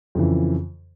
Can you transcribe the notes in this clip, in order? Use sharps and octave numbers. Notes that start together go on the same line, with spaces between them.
F2 C#3 E3